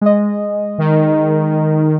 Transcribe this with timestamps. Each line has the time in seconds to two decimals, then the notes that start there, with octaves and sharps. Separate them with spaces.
0.01 G#3 D#5
0.78 D#3